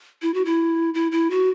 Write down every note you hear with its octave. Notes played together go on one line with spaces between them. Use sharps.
E4
F#4
E4
E4
E4
F#4